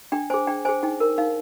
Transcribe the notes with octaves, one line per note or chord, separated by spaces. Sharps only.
D4 G5
G#4 C5 G#5
D4 G5
G#4 C5 G#5
D#4 G5
A#4
D#4 F5